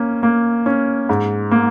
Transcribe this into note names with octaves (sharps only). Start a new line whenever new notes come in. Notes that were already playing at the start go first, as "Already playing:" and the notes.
Already playing: A#3 C#4
A#3
C#4
G#2
A#3